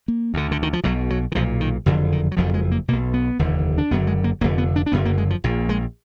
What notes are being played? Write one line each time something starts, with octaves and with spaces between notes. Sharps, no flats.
A#3
D2 D3
D3
D#3
F3
B1 B2 F#3
F#3
D#3
B1 A#2 F3
D#3
F#1 F2 D3 D#3
D#3
F#3
F#1 F2 D3 F3
G#3
A#3
B1 B2 A#3
B3
F1 D#2 D3
D4
F#1 F#2 D3 B3
G#3
A#3
F1 F2 D3 A#3
B3
D4
D4
F#1 F#2 D3 B3
A#3
G#3
F3
A#1 A#2
G#3